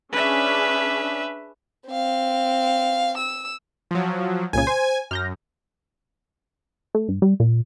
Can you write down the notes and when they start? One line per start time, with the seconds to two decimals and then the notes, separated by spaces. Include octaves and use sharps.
0.12 C#4 D4 G#4 B4 E5
1.89 C4 F5
3.17 E6
3.91 F3 F#3
4.53 C2 A#2 C#3 G#5
4.67 C5
5.11 F#2 F6 G6 A#6
6.95 A3
7.08 G2
7.22 G3
7.40 A#2